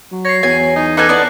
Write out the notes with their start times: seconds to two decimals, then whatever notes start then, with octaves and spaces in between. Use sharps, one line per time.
0.12 F#3
0.25 C#5 A#6 C7
0.43 E2 F#3 G#5
0.76 D#4
0.97 D#4 A4 B4 G#5 D6 F#6
1.09 E3 B3 D5 A5